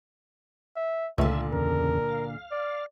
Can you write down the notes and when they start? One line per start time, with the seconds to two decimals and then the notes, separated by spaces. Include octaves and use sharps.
0.76 E5
1.18 C#2 A#2 D3 A3 F4 E5
1.53 E2 C#3 A#4
2.09 F5
2.52 D5